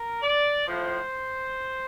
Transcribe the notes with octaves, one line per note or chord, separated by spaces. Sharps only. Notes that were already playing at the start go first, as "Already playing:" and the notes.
Already playing: A#4
D5
A2 F3 C5